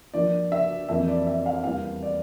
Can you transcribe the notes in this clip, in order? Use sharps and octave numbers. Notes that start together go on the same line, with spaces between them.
G2 F3 A#3 D5
E5
F2 E3 A#3 E5
D5
E5
F5
E2 E3 G3 A#3 F5
D5